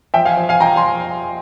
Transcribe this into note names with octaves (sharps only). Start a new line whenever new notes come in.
F3 E5 G5
F5 G#5
F3
F5 G#5
F3 G5 A#5
G#5 C6